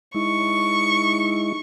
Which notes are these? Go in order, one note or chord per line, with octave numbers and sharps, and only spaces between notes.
G#3 D#4 E4 C#6